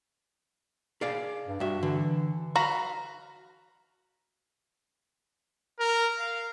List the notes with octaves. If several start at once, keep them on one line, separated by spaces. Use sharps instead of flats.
G#4 D5 F5
G2
G2 F#4 E5
D3 E3
F#4 F5 A#5 B5
A#4
F5